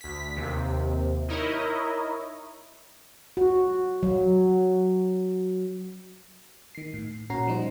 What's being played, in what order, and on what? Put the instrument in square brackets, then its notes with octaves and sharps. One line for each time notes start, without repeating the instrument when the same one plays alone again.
[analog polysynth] D2 B6
D#2 C3
D#4 E4 A#4 C#5 D#5
[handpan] F#4
F#3
[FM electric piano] D#3 C7
A2
A#2 C#4 F#4 A#5 C7
F3 G3 D#4 C5